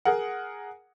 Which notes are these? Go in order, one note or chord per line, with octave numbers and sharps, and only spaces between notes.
G#4 A#4 F#5